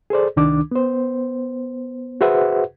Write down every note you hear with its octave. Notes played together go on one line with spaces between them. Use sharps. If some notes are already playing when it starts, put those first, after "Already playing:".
G#4 A4 C5 D5
C2 D#3 D4 D6
B3 C5
F#4 G#4 B4 C5 E5 F#5